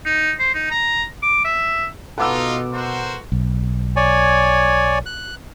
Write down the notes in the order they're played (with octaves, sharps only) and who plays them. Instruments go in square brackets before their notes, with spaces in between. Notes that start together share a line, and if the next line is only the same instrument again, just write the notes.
[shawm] D#4
C5
D#4
A#5
D6
E5
[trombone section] B2 [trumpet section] D#4 F4 [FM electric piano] A4 B4 [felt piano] F#5 D6 E6
[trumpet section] F#4 A#4 C5
[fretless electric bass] B1
[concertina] C#5 D5 G#5
F#6